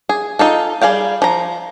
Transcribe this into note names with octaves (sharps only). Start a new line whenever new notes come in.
G#4
D#4 F4 A4
G3 G#4 F5 G5
F3 A#5